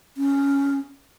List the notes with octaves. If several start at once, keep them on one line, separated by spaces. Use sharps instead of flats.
C#4